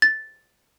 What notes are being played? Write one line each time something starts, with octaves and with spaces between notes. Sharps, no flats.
A6